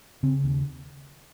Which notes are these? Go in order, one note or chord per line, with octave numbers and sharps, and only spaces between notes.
C#3 C4
D#2